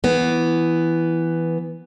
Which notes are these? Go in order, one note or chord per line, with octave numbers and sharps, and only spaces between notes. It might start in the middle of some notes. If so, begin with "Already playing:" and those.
E3 B3